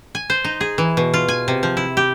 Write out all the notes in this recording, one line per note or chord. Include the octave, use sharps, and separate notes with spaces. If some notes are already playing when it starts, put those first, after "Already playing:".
G#5
C5
D#4
G#4
E3
B2
F4
G#5
C3
F3
E4
G4